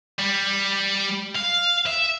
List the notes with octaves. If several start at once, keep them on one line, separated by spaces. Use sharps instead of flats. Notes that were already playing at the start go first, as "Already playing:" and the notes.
G3
F5
E5